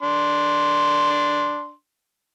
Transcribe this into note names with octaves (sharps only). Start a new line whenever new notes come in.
D4 C6